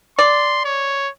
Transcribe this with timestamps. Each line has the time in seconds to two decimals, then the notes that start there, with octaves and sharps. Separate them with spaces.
0.19 D5 C6
0.65 C#5